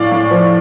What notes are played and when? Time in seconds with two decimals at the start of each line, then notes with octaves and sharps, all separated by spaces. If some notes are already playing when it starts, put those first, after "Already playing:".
Already playing: A2 G#3 D5 F5
0.11 A2
0.31 F3